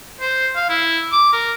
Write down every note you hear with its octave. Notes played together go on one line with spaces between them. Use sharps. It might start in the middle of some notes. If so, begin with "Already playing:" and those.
C5
F5
E4
D6
A#4